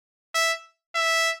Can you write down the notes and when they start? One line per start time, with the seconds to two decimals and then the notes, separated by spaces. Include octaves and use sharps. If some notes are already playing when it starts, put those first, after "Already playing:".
0.35 E5
0.95 E5